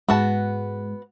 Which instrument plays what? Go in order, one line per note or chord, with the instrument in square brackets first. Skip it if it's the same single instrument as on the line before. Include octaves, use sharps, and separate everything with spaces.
[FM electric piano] G#2 G#3 [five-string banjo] B3 F#4 A5